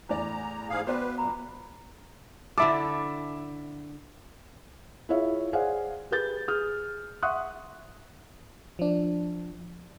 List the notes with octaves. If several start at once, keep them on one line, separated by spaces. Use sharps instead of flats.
E2 A2 D5 A#5
G#2 G#4 F5
B3 F#4 B4 C5 D5 G5 B5
F#2 A#2 A#5 B5
D3 E4 A4 E5 D6
E4 F4 G#4 C#5 E5 F5
G#4 C5 D5 F5 F#5 G#5
G4 G#4 B4 G6 A6
G#4 D#6 F6
E5 F#5 C6 C#6 D#6 F#6
F3 D4